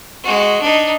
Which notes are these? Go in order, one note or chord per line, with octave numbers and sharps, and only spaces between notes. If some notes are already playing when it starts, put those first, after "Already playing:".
G#3 F#4
D4 D#4